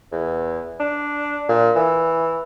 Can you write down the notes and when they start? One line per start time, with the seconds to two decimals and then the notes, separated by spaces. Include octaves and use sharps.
0.11 E2
0.80 D4
1.48 A#2
1.76 E3